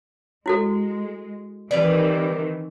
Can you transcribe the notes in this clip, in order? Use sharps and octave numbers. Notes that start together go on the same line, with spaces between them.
G#3 E4 F#4 A4
D#3 E3 G3 C4 B4 D5